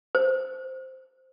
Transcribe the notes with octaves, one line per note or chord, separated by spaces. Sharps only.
C5